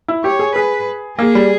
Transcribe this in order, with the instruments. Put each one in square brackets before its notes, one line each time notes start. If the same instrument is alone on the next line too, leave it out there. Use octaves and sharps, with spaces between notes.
[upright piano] E4
[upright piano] G4 [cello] C#5
[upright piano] G#4
[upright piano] G#4 [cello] B4
[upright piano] A#3 [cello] G#4
[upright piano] G3